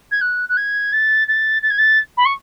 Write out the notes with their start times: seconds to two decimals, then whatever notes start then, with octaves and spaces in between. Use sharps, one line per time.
0.11 G#6
0.21 F#6
0.49 F#6
0.57 G#6
0.93 A6
1.28 A6
1.63 A6
1.70 G#6
1.78 A6
2.17 B5
2.25 C#6